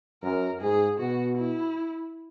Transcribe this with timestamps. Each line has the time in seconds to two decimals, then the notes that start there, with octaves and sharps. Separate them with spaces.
0.23 F#2 A#4
0.61 G#2 G#4
0.99 B2 F#4
1.37 E4